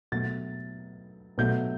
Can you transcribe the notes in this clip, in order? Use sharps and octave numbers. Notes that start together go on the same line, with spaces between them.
B2 F#3 A3 A6
B2 F#3 A3 G6